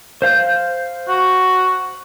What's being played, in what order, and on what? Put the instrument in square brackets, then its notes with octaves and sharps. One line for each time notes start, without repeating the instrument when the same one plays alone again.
[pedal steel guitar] C5 F5 G6
[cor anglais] F#4